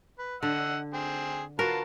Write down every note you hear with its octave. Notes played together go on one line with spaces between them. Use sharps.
B4
D3 D#5 F#5 E6
C4 G#4
F4 F#4 A#4 B4 A5